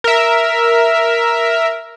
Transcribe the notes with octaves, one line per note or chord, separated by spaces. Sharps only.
A#4 E5